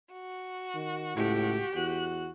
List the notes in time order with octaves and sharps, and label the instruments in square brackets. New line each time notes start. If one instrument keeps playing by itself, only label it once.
[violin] F#4
[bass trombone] D#3
[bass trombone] C#2 [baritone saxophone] A2 [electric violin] G4
[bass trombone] E2 [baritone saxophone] F#4 [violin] F#6